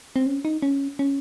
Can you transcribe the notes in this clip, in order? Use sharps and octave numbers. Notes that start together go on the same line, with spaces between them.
C4
C#4
D#4
C#4
C#4